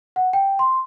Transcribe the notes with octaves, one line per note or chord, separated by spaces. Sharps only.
F#5
G5
C6